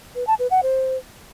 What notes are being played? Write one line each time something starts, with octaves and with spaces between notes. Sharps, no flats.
B4
A5
B4
F#5
C5